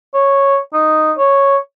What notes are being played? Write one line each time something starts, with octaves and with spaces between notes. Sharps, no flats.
C#5
D#4
C#5